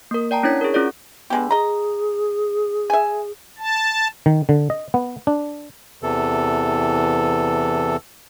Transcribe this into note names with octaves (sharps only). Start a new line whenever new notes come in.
A#3 A#4
D5 G5 A5 A#5
C#4 D4 E4 C#5 G#6 B6
G#4 A#4
C#4 F4 G#4 D5
D3 G#3 B3 G4
G#4 D#5 A#5
E5 G#5
A5
D#3
D3
D#5
B3
D4
E2 C3 E3 A4